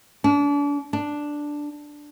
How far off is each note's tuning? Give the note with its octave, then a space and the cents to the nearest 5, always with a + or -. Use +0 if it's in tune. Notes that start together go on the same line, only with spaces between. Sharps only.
D4 -35
D4 +0